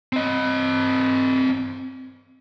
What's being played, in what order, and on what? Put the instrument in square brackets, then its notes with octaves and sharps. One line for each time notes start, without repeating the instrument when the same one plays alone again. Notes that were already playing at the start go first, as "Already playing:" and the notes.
[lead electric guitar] C4 D#5